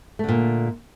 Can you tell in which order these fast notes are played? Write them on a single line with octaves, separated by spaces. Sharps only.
A3 D3 A#2